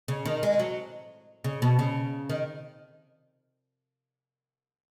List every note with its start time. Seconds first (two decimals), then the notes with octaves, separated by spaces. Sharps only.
0.08 C#3
0.25 D#3
0.43 G#3
0.59 F#3
1.44 C#3
1.62 B2
1.79 C#3
2.29 D#3